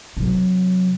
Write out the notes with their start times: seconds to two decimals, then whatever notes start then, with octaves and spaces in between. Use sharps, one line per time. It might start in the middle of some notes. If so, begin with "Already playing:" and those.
0.17 C3 F#3